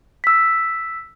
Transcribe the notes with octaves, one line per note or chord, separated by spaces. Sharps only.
E6 B6